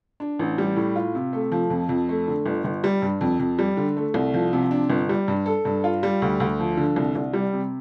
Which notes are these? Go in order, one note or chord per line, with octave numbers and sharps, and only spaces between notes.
D4
A1
G3
A2
F4
C3
A3
F3
F2
F2
A3
D3
G1
G1
G3
G2
F2
F2
G3
D3
A3
C2
F3
C3
D4
G1
G3
G2
A4
G2
F4
G3
D2
D2
F3
D3
C2
C2
G3
C3